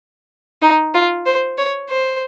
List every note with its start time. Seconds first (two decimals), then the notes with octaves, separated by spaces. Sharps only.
0.62 D#4
0.94 F4
1.26 C5
1.58 C#5
1.90 C5